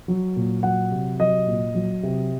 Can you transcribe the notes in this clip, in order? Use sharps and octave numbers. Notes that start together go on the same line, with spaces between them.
F#3
A#2
F#3 F#5
C3
F#3 D#5
A#2
F#3
C3